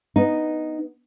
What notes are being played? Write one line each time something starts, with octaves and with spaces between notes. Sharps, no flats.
B3 D#4